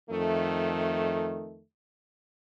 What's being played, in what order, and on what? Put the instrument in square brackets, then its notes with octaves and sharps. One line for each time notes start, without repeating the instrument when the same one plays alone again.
[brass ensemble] F2 D#3 A3